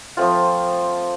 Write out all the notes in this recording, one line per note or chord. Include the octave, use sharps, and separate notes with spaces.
F3 A3 C4 F4